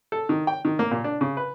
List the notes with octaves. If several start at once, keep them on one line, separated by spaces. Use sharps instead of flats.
A4
D#3
G5
D#3
A#3
A#2
D4
C#3
B4